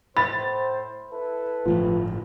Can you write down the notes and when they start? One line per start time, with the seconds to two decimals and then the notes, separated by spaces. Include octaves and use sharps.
0.17 A2 C5 B5 A6
1.11 E4 A4 B4
1.65 G1 A2 F3